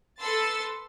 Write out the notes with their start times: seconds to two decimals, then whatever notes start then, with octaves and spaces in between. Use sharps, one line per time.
0.19 A4 B4 C6 E6 A6